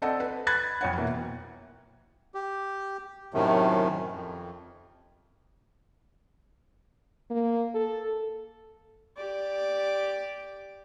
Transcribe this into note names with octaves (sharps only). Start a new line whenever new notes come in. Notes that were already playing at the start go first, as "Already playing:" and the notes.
C4 A4 D5 D#5 F#5 A5
B4
B5 F#6 G#6 A6
F2 C#5 F#5
B2 E3 A#3
G4
F#2 A2 C3 D#3 A3
F2
A#3
A4
G4 D5